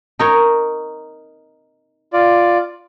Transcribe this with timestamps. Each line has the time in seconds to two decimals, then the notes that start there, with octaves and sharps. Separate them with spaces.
0.19 D#4 A#4 C#5
2.13 F4 D5